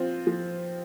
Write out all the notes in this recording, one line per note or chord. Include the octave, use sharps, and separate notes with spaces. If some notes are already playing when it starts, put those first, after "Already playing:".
Already playing: F3 C4 F4 C5
F3